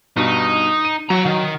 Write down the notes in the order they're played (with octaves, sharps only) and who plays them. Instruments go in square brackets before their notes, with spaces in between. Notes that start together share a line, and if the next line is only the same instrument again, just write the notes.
[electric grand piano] G2 B2 [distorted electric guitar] D#4
[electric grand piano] D#7
[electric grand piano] F#3 [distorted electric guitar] F#5 A#5
[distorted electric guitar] D#3